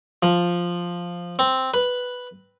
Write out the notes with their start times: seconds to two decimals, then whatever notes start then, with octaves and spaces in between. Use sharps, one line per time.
0.23 F3
1.39 C4
1.74 B4